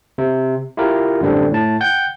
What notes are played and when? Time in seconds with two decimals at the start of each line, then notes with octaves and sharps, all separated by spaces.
0.18 C3
0.77 E4 F4 G4 A#4
1.21 F#2 A2 D3 G3 C4 D4
1.52 A2 A5
1.80 F#5 G5 G6